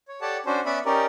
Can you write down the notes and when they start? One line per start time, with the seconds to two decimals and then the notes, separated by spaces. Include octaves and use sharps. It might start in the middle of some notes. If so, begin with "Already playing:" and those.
0.08 C#5
0.21 G4 A4 C#5 D5 F#5 A5
0.46 C#4 D4 F#4 C5
0.65 B3 C#4 D5 E5 F#5 B5
0.86 C#4 D#4 G4 A#4 D5